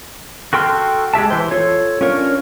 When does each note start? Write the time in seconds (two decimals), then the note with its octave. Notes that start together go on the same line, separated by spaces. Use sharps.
0.53 F#4 A4 G5 C6 F6
1.14 G#3 G4 E5 A5
1.30 E3 C5
1.51 F4 A4 C#5
2.01 C#4 D4 F4 A#4 C#5